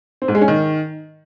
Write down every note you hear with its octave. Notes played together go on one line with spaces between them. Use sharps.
C4
G#2
G#3
C#4
D#3